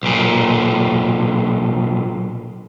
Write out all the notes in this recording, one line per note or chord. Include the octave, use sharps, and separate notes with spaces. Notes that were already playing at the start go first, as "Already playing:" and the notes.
B1 A#2